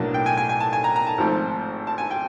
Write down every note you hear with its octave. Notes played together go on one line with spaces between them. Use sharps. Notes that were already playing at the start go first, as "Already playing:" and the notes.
Already playing: B1 A2 F#3 A#3 D4 A5
G5
G#5
G#5
G#5
A5
G#5
A#5
A#5
A5
G#1 G#2 F3 A3 C4
A5
G#5
G5